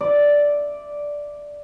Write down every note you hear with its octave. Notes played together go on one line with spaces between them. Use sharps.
D5 E5